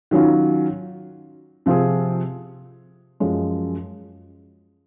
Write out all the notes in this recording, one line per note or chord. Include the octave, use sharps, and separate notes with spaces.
D#3 F#3 C#4 F4
C3 F3 C4 F4 G#4
F#2 F3 G#3